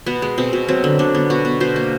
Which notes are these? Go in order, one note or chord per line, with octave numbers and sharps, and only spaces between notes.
B2 B3
G#3
B2 C4
B2
F#3 C4
D3
D3 D4
B3
B2 F#4
B2
B2 C5
A#3